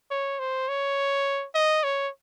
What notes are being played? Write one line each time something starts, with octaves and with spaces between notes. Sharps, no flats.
C#5
C5
C#5
D#5
C#5